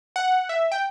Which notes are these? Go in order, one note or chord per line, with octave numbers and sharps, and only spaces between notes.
F#5
E5
G5